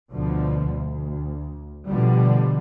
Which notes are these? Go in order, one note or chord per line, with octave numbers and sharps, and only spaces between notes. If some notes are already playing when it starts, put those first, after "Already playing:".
D2 B2 D3 F3 A3
D2
B2 D3 F3 G3